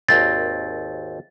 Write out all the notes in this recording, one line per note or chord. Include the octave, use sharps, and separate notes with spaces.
G#1 D#2 C4 A6